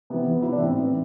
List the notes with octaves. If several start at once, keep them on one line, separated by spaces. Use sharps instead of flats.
C3 E3 B3
E2
C3 E3 E4
D4
A2 C4
E3